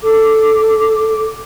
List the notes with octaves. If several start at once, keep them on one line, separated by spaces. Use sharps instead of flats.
A4 D6